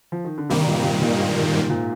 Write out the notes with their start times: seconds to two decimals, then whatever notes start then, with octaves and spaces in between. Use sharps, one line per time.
0.12 F3
0.24 D#3
0.38 D3
0.49 G2 C3 D#3 G3 A#3
0.67 A#2
0.77 C3
0.84 A#2
1.01 A#2
1.18 G#2
1.36 A#2
1.52 G#2
1.69 A#2